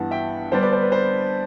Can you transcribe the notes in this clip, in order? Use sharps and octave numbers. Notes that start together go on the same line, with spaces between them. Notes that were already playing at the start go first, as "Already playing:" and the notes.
Already playing: G2 E3 B3 F#5 A5
E5 G5
D3 G3 B3 D4 C5
B4 D5
C5
B4
C5